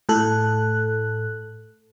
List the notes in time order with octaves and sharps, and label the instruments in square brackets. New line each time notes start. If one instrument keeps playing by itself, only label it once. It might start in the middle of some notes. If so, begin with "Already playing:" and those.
[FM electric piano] A2 A4 F#6